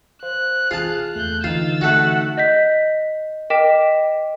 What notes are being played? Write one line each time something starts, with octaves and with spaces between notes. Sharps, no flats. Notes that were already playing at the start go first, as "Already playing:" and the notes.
C5 F5 F#6
F4 G#4 G#5 A5 F6
E2 A3 F#6 G6
D3 E3 D#4 F4 E6 A6
A3 F#4 F#5
D#5 G6 B6
A#4 D#5 G5 D6 B6 E7